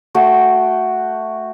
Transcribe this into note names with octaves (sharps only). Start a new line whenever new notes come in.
A3 F#4 G5